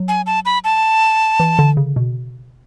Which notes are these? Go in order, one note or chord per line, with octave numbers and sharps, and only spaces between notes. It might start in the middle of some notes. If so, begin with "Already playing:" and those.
Already playing: F#3
G#5
A5
B5
A5
E3
D3
C#3
B2